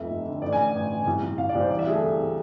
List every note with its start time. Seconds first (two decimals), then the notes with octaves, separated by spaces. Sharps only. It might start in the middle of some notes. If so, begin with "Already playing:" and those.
Already playing: F1 F2 E5
0.10 F1
0.26 D3
0.42 A1 D5
0.52 G#5
0.58 A2
0.74 A1
0.90 A1
1.06 C2
1.22 C2
1.38 C2 F5
1.49 D5
1.55 C2 C5
1.70 E3 D5
1.79 E5
1.87 D2 G#4
1.94 A4
2.02 C3
2.19 C3